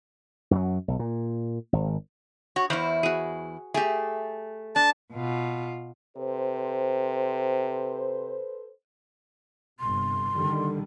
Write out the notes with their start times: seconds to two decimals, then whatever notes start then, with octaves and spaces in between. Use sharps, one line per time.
0.51 F#2 F3 F#3
0.88 B1
0.99 A#2
1.73 G#1
2.56 F#4 C#5
2.70 E2 E4 C5 F5 F#5
3.03 F#4 G#4
3.74 A3 G4 G#4
4.76 D4 A5
5.12 B2 F4
6.17 C3 A4 B4 C5
9.80 G1 C3 C6
10.36 D3 D#3 G3